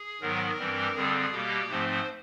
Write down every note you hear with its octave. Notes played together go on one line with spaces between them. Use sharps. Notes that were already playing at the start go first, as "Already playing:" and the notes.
Already playing: G#4
G#2 D#3 F#3 B3 A#4
G2 E3 G3 C4
F2 D3 G3 C4 G#4
B2 G3 A#3 G4
G#2 F3 A3 C4 C5